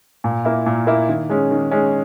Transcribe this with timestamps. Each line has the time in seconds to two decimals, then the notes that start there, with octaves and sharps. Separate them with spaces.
0.24 A#2
0.45 A#3 E4
0.66 A#2
0.87 A#3 E4
1.09 D#3
1.29 G#3 C#4
1.51 D#3
1.71 G#3 C#4